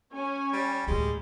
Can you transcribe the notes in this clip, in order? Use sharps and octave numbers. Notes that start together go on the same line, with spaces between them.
C#4 C#5 G#5
G3
D2 A2 G3 G#3